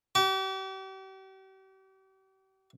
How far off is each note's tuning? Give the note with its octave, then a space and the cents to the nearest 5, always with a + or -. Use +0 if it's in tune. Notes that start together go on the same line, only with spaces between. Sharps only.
G4 -40